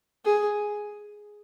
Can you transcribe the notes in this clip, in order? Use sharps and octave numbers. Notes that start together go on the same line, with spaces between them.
G#4